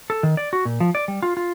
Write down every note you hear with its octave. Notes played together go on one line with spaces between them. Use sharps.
A4
D#3
D5
F#4
A#2
F3
D5
G3
F4
F4